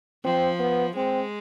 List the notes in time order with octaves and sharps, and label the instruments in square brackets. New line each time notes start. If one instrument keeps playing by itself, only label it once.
[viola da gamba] F3 [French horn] C4
[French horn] B3
[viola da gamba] G#3 [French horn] C4